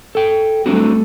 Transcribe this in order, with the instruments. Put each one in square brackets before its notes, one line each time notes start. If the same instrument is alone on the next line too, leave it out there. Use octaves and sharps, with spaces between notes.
[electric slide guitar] A4 G5
[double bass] G3 A3 [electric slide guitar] C4 D4 F#4